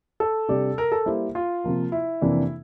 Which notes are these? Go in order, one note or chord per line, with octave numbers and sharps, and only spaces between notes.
A4
C3 G3 D4 G4 D5
A#4
A4
G3 A#3 E4 G4 C5
F4
C3 F3 A#3
E4
F2 C3 E3 A#3 D4